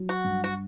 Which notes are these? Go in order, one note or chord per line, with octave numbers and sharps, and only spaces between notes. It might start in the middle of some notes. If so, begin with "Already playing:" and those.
Already playing: F#3
F#4
G2
F#4